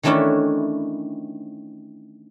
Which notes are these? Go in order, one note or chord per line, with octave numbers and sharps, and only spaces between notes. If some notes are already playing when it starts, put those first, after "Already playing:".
D#3 E3 A3 C#4 D4 E4